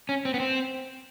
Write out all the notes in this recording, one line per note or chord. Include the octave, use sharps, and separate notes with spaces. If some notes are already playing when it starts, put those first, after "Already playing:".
C#4
C4
B3
C4